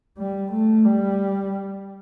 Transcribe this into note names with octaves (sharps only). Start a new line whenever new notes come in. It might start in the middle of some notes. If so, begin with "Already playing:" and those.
G3
A3
G3